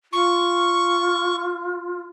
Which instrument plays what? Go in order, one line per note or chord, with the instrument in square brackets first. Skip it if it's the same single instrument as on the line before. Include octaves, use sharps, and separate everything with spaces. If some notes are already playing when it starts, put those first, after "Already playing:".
[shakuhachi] F4 [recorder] C#6